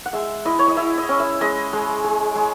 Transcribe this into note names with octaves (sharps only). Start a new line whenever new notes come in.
F#5
G#3 E5
E4 D#5
C#5
D#5
E4 E5
D#5
C#4
E5
G#3 D#5
G#3
G#3
G#3